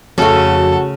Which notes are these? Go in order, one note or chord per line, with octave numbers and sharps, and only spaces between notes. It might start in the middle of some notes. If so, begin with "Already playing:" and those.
F2 C#3 A3 F#4 A4